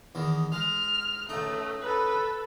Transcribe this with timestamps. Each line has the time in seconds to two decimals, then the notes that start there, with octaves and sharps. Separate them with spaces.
0.15 E2 D#3
0.52 G#3 F6
1.29 C#2 A3 D#4
1.81 A4 B4